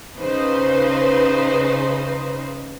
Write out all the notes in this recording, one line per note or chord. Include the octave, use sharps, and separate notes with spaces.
C#3 D#4 B4 C5